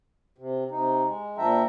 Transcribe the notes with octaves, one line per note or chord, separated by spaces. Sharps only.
C3
C3 D#4
G#3
A#2 F3 D4 E5 G5 A#5